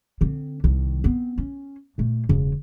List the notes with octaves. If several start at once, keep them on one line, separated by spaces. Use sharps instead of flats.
D3 C4
C2 D#3
B3 C4
C#4
A#2 A3
E1 C#3